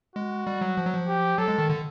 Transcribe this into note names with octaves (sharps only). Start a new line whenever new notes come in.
G#3 F#4
G3
F#3
F3
F#3
F3
G4
F#3 A4
G#3
D#3
D3